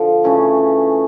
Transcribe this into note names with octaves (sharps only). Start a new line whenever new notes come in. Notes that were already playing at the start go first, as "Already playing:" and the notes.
Already playing: D3 F3
C#3 E3 A3 C#4